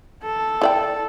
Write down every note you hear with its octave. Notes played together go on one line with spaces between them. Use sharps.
A4
E4 D5 G5